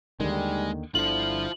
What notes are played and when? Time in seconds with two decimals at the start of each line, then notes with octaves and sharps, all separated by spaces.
0.20 D#2 D3 D#3 G3 G#3
0.95 G1 D3 E4 F4 C5 F#7